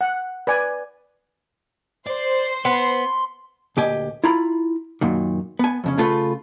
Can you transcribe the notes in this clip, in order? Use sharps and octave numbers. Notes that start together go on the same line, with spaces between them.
F#5
B4 D5 G#5
C5 D5
B3 C6
D2 A#2 G4 D#5 G#5
E4 F4 A#5 B5
F#2 A#2 D#3
B3 G#5
F2 C#3 C#4
C#3 A3 F4 G#4 B4